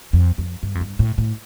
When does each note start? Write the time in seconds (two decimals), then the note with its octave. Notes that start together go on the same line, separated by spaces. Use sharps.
0.13 F2
0.38 F2
0.63 G2
0.75 F2
0.81 G2
0.99 A2
1.18 A2